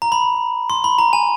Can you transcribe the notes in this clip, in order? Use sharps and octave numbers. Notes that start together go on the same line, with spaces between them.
A#5
B5
C6
B5
A#5
G#5